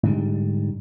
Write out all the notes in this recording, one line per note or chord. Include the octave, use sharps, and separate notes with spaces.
G#2 D3 G3